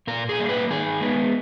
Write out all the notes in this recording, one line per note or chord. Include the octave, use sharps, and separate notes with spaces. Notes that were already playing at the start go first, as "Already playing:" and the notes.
A#2 A#4
G#4
G3 A#3
B4
D#3 G#4
G#3 B3